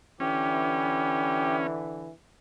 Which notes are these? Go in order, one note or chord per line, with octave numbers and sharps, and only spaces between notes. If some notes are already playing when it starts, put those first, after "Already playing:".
D3 E3 C#4 G4